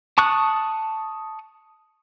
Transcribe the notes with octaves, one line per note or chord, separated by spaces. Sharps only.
A5 C#6 D#6 F#6